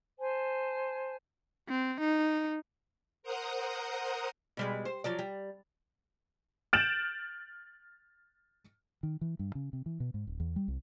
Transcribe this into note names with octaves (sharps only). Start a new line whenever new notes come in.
C5 G#5 A5
C4
D#4
A#4 C5 F#5 A#5 D#6
B2 G3 G#3
C5
F3 F#3 D5
G3
F6 G6 A6 D7 E7 F#7
D#3
E3
G2
C#3
C3
E3
B2
G#2
D1
E2
G3
C2